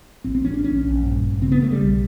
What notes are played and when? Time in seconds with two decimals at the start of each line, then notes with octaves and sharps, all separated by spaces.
0.24 A1 C4
0.35 C4
0.44 A1 C#4
0.54 D4
0.64 A#1 C#4
0.83 A#1
1.03 G2
1.22 A1
1.41 C#3 C4
1.52 B3
1.62 C#3 A3
1.71 G3
1.81 B1